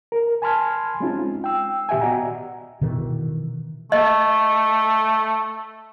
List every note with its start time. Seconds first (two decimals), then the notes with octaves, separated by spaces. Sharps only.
0.12 A#4
0.42 G#5 A5 B5 C6 F6 G#6
1.00 G#3 C4 C#4 D#4 F4
1.44 G5 E6
1.89 A#2 D#3 G4 E5 G5 G#5
2.01 B3 F#4 D5 D#5 F#5 A#5
2.81 B2 D#3 E3
3.92 A3 D#5